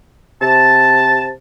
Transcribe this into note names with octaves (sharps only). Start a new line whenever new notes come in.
C3 A5